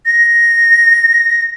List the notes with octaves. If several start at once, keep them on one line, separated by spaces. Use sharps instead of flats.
A#6